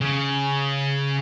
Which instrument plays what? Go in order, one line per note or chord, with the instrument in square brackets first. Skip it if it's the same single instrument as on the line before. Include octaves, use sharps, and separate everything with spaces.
[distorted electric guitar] C#3